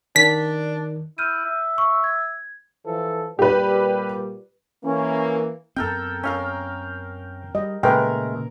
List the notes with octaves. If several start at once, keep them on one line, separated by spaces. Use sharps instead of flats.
D#3 D4 B6
E4 F6 G6 D#7
E5
C#6 E6
G#6
E3 F3 A4
A#2 G3 G4 B4
E3 A#3 C#4
F#2 B3 C4 A4 A#4 G5
C#4 A#4 F5 G5
G3 D#5
A#2 C#3 G#3 A3 A#4 B4 G5